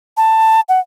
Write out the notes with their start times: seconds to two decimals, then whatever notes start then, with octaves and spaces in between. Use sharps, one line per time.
0.17 A5
0.69 F#5